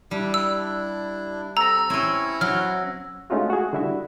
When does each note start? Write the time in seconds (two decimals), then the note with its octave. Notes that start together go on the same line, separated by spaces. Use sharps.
0.11 G3 D4 E4
0.34 E6
1.57 C4 A4 A#5 E6 A#6
1.90 C4 C#4 E4 C#5
2.41 F#3 F6
3.30 G#3 A3 C#4 D#4 F4 F#4
3.50 F#4 G#4
3.73 D3 G3 E4 F#4 E5